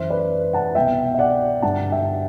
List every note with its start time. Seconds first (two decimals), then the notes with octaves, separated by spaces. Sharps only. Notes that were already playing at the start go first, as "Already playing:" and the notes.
Already playing: F#2 E3 C5 E5
0.09 B4 D5
0.53 F#5 A5
0.75 C2 B2 E5 G5
1.14 E5
1.19 D5 F#5
1.62 G2 D3 F#5 A5
1.92 E5 G5